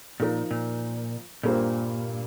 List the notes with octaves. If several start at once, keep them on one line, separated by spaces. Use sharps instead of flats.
A#2 F3 D#4 A#4
A#2
G2 A#2 G3 A#3 F4 C5